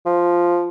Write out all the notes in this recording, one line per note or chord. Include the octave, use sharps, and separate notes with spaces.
F3